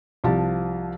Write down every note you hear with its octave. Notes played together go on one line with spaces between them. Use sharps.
C2 F3 A5